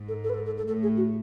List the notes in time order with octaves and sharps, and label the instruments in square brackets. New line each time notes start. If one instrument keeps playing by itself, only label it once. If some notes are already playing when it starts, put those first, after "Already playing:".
Already playing: [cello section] G#2
[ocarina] A4
A4
B4
A4
A4
A4
[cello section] A2 [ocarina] A4
[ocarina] G#4
F#4